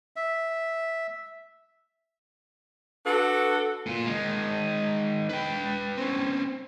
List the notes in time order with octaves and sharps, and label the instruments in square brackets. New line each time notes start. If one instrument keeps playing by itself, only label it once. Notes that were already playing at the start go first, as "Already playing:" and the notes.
[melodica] E5
[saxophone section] D4 F#4 A4 B4
[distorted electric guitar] A#2 F4
D#3 G#3
B4 G5
C4 C#4